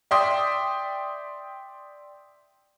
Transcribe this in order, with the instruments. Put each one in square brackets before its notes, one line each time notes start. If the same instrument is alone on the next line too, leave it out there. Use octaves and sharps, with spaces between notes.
[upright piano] D5 E5 G5 C6 D#6